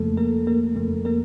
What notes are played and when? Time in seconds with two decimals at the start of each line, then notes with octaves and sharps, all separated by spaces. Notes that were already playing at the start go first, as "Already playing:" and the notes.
Already playing: F2 C#3 F3 A3 A#3 A4
0.17 A#3 A#4
0.47 A#3 A#4
0.76 F2 C#3 F3 A#3
1.05 A#3 A#4